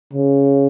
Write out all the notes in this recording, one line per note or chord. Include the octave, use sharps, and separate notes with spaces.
C#3